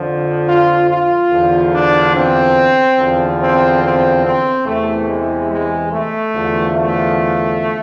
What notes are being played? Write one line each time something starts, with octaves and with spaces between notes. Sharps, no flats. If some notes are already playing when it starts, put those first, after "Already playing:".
Already playing: F2 D3 F3
F4
F4
E2 D3 F3
D4
C4
E2 D3 F3
C4
C4
C4
E2 C3 E3 A3
G#3
G#3
A3
E2 D3 F3
A3